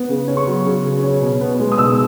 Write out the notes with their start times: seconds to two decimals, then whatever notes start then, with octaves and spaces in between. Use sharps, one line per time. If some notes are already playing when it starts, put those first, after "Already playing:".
Already playing: B3
0.09 C#3
0.28 C#4
0.37 C#6
0.47 F#3
0.65 C#3
0.85 C#3
1.03 C#4
1.22 B2
1.41 B3
1.60 G#3
1.72 D#6
1.78 B2 E6